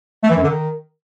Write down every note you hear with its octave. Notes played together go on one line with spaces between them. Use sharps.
A3
E3
F#2
D3
D#3